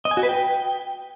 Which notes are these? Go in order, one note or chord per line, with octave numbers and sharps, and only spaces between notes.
D#5
G#5
F#4
B4
G5